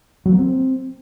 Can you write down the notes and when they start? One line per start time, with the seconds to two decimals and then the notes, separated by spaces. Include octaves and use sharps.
0.26 F#3
0.32 A#3
0.39 C4